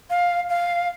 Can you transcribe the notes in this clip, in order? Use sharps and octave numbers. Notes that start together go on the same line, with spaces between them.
F5
F5